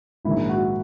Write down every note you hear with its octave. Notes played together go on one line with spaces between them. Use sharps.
A#1 G#2 D#3 E4
F#4